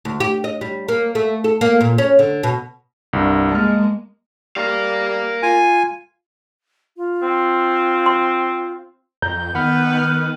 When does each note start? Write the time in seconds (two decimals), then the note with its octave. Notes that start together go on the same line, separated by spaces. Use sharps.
0.05 D2
0.20 G4
0.44 D#5
0.61 G3
0.88 A#3
1.15 A3
1.44 A4
1.61 A#3
1.81 A#2
1.98 C#4
2.19 D3
2.43 B2
3.13 C2 G2
3.52 G#3 A#3 A5 F6
4.57 G3 A#4 F5
5.43 F4 G#5
6.97 F4
7.22 C4
8.06 C6
9.22 F2 A#5 G6
9.55 D#3 B3 B4 F#5 B5 F6
9.99 F6